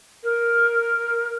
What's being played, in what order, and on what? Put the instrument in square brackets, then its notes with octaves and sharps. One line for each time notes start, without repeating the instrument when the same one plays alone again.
[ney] A#4